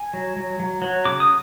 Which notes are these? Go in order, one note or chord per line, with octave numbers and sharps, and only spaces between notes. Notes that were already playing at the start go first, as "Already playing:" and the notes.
Already playing: G#5
F#3
F#3
F#3
F#3
C#3 D6
D#6